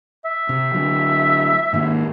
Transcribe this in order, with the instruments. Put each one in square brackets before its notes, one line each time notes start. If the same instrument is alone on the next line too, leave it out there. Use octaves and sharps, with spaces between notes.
[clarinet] E5
[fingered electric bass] C3
D3 F#3
G#2 D#3 A#3